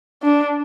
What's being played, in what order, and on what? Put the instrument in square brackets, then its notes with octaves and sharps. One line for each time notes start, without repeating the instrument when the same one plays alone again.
[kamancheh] D4